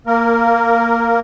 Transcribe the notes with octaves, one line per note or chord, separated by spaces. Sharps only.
A#3 A#4